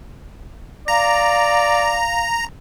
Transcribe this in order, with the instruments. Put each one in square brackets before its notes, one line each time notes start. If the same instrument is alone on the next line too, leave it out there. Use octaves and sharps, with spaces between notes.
[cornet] D5 [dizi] F5 [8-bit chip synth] A#5